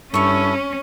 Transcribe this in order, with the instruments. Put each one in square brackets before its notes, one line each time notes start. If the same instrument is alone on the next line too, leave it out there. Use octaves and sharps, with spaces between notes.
[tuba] G2 [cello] C#4 [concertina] E4 A4 [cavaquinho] C#5 C#6